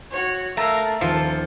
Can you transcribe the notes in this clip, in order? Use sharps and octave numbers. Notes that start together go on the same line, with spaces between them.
F#4 C#5
A3 A#4 F5 A#5
D#1 F3 A4 A#4